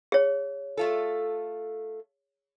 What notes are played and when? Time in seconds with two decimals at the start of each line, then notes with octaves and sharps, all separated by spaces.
0.12 G#4 C#5
0.77 A3 F4 A4